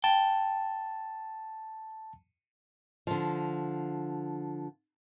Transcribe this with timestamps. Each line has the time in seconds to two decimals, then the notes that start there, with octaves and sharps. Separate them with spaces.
0.04 G5 A5
3.07 D3 F3